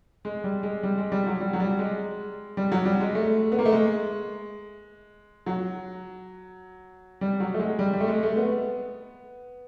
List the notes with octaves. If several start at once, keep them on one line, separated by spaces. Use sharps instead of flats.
G#3
G3
G#3
G3
G#3
G3
F#3
G3
F#3
G3
G#3
G3
F#3
G3
G#3
A3
B3
A#3
A3
G#3
F#3
G3
F#3
A3
G#3
G3
G3
A3
G#3
A3
B3